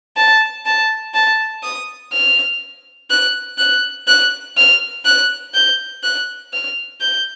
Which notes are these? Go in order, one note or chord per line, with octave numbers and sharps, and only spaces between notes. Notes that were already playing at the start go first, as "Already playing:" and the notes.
A5
A5
A5
D#6
F6
F#6
F#6
F#6
F6
F#6
G6
F#6
F6
G6